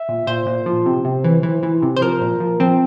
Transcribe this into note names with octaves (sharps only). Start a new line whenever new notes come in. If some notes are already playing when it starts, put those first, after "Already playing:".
Already playing: E5
A#2
A#2 C5
A#2
F3
C3
C3
E3
E3
E3
C3
C5
F3 A#4
A#2
F3
F3 C4